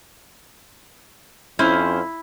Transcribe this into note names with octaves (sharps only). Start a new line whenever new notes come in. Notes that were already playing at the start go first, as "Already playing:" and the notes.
F2 C#4 E4 C5